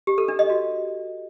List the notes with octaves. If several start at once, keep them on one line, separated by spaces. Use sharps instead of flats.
G4
A4
D4
D#5
F#4